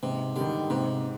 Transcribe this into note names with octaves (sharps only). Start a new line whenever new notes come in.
G#2 C3
D3 D#3 G3
G#2 C3